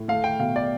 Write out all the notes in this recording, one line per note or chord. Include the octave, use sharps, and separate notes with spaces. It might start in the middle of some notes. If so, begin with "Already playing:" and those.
Already playing: A2
A3 F5
G5
B2 F5
D5